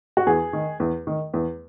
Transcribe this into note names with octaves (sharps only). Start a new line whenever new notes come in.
F#4
E2 G#4
D#3
E2
D#3
E2